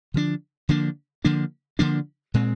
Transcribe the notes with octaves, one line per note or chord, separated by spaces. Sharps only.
D3 F3 A#3 D4
D3 F3 A#3 D4
D3 F3 A#3 D4
D3 F3 A#3 D4
A#2 G#3 C4